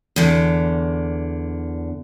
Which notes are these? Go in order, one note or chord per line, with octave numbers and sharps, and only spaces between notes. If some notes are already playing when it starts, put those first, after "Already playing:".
E2 D3